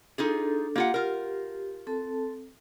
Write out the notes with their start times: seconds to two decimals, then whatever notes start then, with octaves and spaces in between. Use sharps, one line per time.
0.18 D4 D#4 F4 G#4 A4
0.76 A#3 F4 G4 F#5
0.94 F4 A#4
1.87 C4 A4 A5